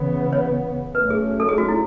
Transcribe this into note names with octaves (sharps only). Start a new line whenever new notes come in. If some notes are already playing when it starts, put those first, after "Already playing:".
Already playing: C#3 E3 B3
C#5
A2 F#3 A3 C#4 B4
G#4
A4
G#4
F#4
E4